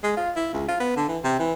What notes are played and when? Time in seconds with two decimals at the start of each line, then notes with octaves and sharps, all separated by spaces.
0.04 G#3
0.17 F4
0.36 E4
0.54 C#2
0.68 F4
0.80 B3
0.97 D3
1.08 E3
1.24 C3
1.39 E3